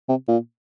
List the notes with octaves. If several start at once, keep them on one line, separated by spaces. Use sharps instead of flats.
C3
A#2